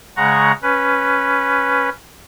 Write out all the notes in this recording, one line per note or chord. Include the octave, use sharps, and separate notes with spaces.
C#3 G#3 F#5 A#5 C#6
C#4 B4